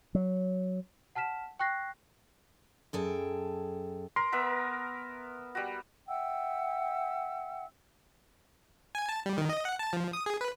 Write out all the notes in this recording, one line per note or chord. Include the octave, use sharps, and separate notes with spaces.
F#3
F#5 A5 F6 B6 E7
G5 C#6 F#6 A#6 C7
F#2 G#4 A4 G5
A#4 C6
B3 A#4 E5
G3 F#4
E5 F#5 G5 E6
G#5
A5
G3
D#3
D#5
F#5
A5
F3
D#6
G#4
B4